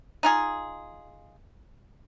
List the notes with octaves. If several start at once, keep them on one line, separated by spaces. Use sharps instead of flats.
D#4 F4 G#4